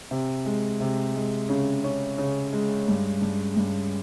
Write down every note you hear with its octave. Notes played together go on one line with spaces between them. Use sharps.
C3
G#3
C3
G#3
C#3
C#4
C#3
G#3
G2
G2
G2